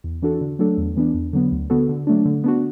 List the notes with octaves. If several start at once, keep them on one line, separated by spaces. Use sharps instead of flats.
E2
E3 D4 F#4 A4
D3
F#3 A3 D4 A4
E2
E3 B3 D4
E2
D3 F#3 B3
D2
D3 B3 F#4 A4
D3
F#3 A3 D4
D3
B3 D4 F#4